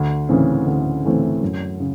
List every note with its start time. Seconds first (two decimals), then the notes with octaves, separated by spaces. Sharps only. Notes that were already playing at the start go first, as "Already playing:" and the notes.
Already playing: D2
0.29 C#3 E3 A3 C4
0.67 D2
1.04 C#3 E3 A3 C4
1.43 F#2
1.80 C#3